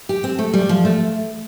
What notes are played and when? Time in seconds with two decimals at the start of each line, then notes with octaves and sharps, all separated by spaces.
0.09 G4
0.24 C4
0.39 A3
0.54 G3
0.69 F3
0.85 A3